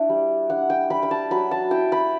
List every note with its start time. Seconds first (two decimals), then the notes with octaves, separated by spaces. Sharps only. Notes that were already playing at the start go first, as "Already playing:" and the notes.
Already playing: D4 E4 E5
0.09 G3
0.50 D4 F#5
0.70 G5
0.90 G3 B5
1.03 B5
1.11 A5
1.31 F#3 B5
1.51 A5
1.71 E4 G5
1.92 B5